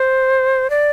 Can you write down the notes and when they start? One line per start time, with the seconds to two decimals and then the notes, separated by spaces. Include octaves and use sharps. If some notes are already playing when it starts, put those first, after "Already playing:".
Already playing: C5
0.70 D5